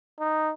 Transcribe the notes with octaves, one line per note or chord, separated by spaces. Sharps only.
D#4